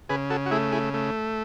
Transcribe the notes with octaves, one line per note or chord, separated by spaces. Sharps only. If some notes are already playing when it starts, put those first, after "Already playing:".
C#3 G#4 B4
F#4 A4
F#4
A3 E4 G#4
E4 G#4
A3